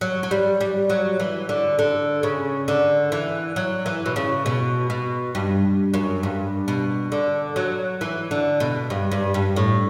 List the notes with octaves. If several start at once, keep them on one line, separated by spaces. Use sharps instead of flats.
F#3
F#3
G3
G3
F#3
E3
D3
D3
C#3
D3
E3
F#3
E3
B2
C#3
B2
B2
G2
F#2
G2
B2
D3
F#3
E3
D3
B2
G2
G2
G2
A2